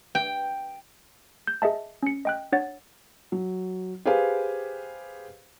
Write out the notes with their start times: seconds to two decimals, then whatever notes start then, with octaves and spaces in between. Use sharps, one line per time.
0.15 G5
1.47 G6
1.62 G#4 D#5 E5 A5
2.03 C#4 C#7
2.25 D#5 G5 F#6
2.52 D4 C#5 F#5 A6
3.32 F#3
4.05 G4 G#4 B4 C5 F5 G#5